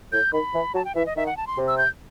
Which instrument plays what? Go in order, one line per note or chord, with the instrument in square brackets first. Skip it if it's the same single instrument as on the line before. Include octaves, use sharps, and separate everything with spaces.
[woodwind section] A2 [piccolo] G6
[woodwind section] D#3 [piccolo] B5
[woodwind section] E3
[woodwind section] F#3 [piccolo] A5
[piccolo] G5
[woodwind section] E3 [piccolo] E5
[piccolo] D#5
[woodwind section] D#3 [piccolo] E5
[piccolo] F#5
A5
C6
[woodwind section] C3
[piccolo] E6
G6